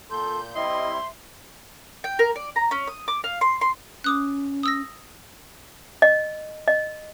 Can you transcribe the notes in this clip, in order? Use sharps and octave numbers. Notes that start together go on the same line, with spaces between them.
A#2 A4 C6 G6
G3 C4 E4 C5 D#5 E5 C6
G5
A#4
D5
A#5
C#4
D#6
D6
F5
C6
C6
C#4 D6 D#6 F#6
D#6 E6 A#6
D#5
D#5